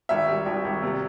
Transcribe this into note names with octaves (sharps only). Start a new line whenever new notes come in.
G#1 E5
G3
G#1
G#1
C3